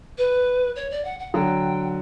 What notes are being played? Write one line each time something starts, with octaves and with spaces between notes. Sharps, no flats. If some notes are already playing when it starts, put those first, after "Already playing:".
B4
C#5
D5
F#5
F#5
D3 F#3 G5